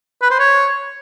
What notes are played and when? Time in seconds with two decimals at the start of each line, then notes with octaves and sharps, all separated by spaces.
0.22 B4
0.31 C5
0.39 C#5